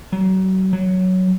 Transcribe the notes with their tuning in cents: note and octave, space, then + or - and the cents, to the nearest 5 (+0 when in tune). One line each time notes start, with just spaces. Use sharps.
F#3 +30
F#3 +5